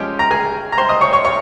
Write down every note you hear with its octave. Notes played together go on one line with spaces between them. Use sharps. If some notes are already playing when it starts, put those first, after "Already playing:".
Already playing: F3 G#3 C#4 G4 G5
A#5
G#4 G#5
A#5
C5 C6
D#5 D#6
C#5 C#6
C#5 C#6
C#5 C#6